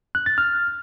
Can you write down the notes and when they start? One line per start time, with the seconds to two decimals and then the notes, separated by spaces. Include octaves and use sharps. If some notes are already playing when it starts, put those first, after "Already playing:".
0.15 F#6
0.26 A6
0.38 F6